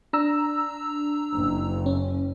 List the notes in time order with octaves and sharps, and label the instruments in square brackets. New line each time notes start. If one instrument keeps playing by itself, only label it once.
[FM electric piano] D4 A#5 E6
[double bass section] F#1
[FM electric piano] C#4